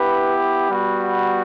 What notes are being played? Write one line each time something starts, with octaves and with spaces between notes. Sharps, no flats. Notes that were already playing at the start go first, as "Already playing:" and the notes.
Already playing: B3 E4 G4 B4
G3 B3 F#4